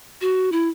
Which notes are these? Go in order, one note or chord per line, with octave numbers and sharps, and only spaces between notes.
F#4
E4